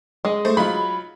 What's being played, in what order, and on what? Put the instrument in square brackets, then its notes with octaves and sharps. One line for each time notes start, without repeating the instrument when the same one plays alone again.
[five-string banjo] G#3 [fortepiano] D#5
[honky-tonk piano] A3 C5
[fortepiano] F#3 D#4 F4 [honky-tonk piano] B5